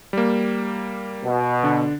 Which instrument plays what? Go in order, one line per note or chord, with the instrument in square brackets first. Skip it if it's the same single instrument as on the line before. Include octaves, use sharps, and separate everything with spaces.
[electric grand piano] G3 A#3
[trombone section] B2
[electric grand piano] D3 D4